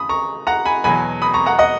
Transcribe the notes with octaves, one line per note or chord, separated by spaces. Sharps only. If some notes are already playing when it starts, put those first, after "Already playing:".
Already playing: C#3 B5 D#6
A#5 C#6
F#5 A#5
G#5 B5
E2 B2 F#3 G#5 B5
B5 D#6
A#5 C#6
F#5 A#5
D#5 F#5